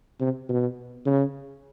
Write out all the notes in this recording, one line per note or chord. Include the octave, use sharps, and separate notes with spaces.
C3
B2
C#3